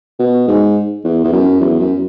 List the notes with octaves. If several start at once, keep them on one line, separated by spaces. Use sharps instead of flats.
B2
G#2
E2
E2
F#2
E2
F#2